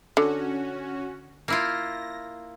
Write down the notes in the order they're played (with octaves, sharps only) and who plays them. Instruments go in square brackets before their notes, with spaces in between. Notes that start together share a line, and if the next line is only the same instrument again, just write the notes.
[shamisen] D3 [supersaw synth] C#4 F#4
[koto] A#3 E4 F4 [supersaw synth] A#6